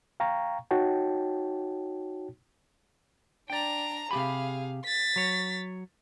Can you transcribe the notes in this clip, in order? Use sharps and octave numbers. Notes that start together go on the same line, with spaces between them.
F5 G5 A#5 C#6
D#4 F#4 C#5 G5 A5
D4 D5 G5 A#5
C3 G4 G#4 F5 B5
A6 B6
F#3 C#5